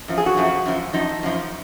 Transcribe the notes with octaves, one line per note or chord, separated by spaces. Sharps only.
F#2 F3
G#4
F#4
F#2 F3
F#2 F3
F#2 F3 D#4
F#2 F3